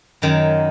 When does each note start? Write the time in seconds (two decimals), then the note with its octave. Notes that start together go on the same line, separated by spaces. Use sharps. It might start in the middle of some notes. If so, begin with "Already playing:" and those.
0.22 F#2 D#3 F#3